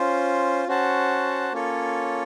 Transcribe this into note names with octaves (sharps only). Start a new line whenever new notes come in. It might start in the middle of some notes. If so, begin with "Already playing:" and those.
Already playing: C#4 F4 C5
C#4 F#4 C5 F#5 A5
A#3 C#4 F4 A4 C#5